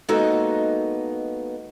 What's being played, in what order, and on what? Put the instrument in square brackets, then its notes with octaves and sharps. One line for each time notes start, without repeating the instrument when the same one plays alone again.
[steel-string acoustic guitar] G#3 A#3 B3 D#4 F#4 A4